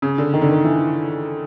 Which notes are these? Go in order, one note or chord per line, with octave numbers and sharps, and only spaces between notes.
C#3
D3
D#3
D3
D#3
E3